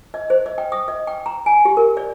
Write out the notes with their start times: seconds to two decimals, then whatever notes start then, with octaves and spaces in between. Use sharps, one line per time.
0.14 D#5
0.30 C5
0.46 D#5
0.58 G5
0.72 D#6
0.88 D#5
1.07 G5
1.26 A#5
1.46 G#5
1.65 G4
1.77 A#4
1.97 D5